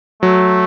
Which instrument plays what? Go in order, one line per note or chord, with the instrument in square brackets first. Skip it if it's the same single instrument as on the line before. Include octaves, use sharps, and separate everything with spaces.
[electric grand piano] F#3 [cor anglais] A3